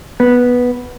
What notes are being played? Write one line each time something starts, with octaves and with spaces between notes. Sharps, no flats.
B3